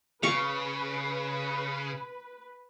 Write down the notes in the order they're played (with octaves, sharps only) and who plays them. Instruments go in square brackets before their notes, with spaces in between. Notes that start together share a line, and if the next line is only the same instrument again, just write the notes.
[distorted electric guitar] C#3 [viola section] B4 [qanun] F5 C#6